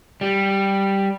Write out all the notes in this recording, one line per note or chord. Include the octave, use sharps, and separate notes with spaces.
G3